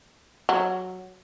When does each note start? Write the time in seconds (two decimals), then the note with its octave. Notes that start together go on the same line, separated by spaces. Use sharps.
0.49 F#3